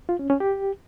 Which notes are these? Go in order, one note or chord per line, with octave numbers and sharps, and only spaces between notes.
F4
C#4
C#4
G4